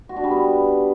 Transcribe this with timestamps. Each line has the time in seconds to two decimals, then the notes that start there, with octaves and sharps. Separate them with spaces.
0.09 F#4
0.16 D4
0.24 G3
0.31 B3